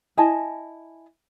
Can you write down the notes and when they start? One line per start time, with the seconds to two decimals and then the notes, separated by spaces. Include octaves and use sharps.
0.17 E4 D#5 G#5 A5